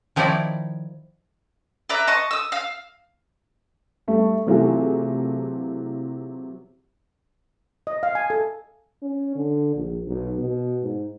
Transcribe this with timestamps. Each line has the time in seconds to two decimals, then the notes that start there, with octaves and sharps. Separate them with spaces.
0.16 D#3 F3 D#4 E4 C#5 D5
1.89 B4 D5 E5 A#5
2.07 D#5 A5 C#6
2.31 D#6 E6
2.52 F5 E6
4.08 G2 A3
4.46 C3 E3 F#3 A3 F4 G#4
7.87 D#5
8.03 F5
8.15 G#5
8.30 A4
9.02 C#4
9.36 D3
9.75 A#1
10.07 B1
10.38 B2
10.83 G#2